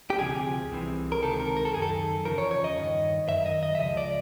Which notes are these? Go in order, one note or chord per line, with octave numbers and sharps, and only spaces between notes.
G4
D2 C3 F3 G#4
C2 C3 E3
A#4
C#2 C3 D#3 A4
A#4
A#4
A4
F#2 D#3 G#4
A4
E2 C#3 F3 A#4
C#5
C#5
D#5
G2 D#3
F#2 D#3 E5
D#5
D#5
E5
C#2 C#3 F3 D#5
D5